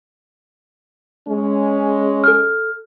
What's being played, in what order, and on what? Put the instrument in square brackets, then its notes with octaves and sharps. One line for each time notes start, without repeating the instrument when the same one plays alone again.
[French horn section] G#3 C#4
[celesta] A4 F6